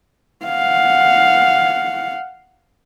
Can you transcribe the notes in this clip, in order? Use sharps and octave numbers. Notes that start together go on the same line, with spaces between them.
F5 F#5